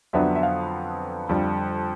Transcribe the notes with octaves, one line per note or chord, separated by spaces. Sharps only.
F2 D3 F#3 B3 D4 E5
E5
F5
F2 D3 G3